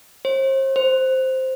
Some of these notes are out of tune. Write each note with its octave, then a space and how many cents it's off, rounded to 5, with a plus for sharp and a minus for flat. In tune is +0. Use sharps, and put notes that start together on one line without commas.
C5 +40
C5 +0